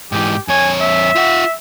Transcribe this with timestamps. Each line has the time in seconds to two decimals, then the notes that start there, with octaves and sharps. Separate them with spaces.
0.12 G#2 E3 G4
0.48 F2 C#5 G#5
0.80 E5
1.15 F4 F#5